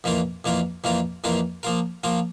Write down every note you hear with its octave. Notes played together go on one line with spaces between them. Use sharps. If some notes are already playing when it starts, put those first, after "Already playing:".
F2 E3 A#3 F4 A#4
F2 E3 A#3 F4 A#4
F2 E3 A#3 F4 A#4
F2 E3 A#3 F4 A#4
F3 A#3 F4 A#4
F3 A#3 F4 A#4